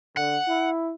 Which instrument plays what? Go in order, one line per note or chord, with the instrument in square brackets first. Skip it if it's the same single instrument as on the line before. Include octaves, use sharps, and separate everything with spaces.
[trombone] D3 [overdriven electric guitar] F#5
[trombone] E4